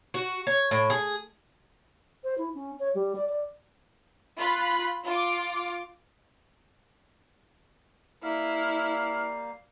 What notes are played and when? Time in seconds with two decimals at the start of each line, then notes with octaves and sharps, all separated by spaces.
0.14 F#4
0.47 C#5
0.71 A2
0.90 G#4
2.24 C5
2.38 E4
2.55 C#4
2.79 C#5
2.95 G3
3.15 D5
3.29 D5
4.39 F4 B5 F#6
5.06 F4 D6
8.23 G3 A#3 E4 F5 F6